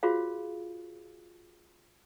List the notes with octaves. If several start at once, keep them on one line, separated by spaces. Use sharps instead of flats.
F4 F#4 G#4 C5 F5